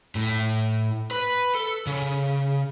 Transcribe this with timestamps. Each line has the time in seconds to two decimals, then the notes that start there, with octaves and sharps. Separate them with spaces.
0.15 A2
1.11 B4
1.55 A4
1.87 C#3